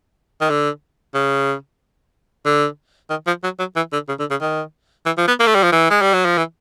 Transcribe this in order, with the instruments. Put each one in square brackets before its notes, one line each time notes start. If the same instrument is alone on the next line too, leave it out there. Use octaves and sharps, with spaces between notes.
[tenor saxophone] D#3
D3
C#3
D3
D#3
F3
F#3
F#3
E3
D3
C#3
D3
C#3
D#3
E3
F3
B3
A#3
A3
G3
F3
E3
G#3
G3
F#3
F3
E3